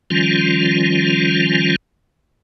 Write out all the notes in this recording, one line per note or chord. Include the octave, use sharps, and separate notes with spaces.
D#3 F3 G3 C#4 F4